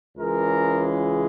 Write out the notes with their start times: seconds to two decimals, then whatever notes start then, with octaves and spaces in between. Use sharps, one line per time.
0.15 C#2 C#3 E3 G#3 A#4